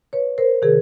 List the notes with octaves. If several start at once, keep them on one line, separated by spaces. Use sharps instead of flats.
B4 C#5
A#4 C5
C3 D#3 G#4 A#4